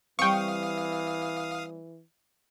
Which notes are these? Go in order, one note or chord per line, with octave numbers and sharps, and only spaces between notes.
E3 G3 C4 F5 G5 C#6 D#6